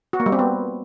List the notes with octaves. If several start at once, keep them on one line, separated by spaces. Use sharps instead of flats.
F#4
A#3
G3
C4
B3